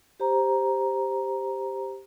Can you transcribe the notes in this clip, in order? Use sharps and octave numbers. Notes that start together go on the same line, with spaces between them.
G4 C5 A#5